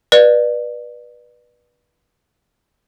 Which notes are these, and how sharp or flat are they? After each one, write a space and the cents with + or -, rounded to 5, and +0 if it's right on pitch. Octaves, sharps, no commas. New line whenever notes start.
B4 -25 D5 +30